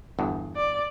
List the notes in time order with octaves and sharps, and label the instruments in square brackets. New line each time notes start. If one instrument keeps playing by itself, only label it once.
[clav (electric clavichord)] G1 E2 G2
[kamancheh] D5